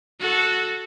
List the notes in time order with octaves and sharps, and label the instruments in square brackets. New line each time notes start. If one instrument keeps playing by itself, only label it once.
[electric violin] F#4 A4